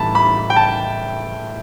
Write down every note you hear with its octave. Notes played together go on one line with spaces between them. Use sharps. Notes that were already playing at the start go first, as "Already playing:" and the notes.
Already playing: A2 E3 G3 A5 B5
B5
G5
A5